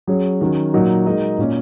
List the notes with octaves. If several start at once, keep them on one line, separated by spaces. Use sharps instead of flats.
F#3 C#4 G#4 C#5
D#3 F#3 C#4 F#4
A#2 F#3 D#4 F#4 A#4
G#3 D#4 F#4 A#4 D#5
A#2 A#3 C#4